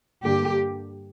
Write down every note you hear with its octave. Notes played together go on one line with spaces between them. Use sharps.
G2 D3 A#3 G4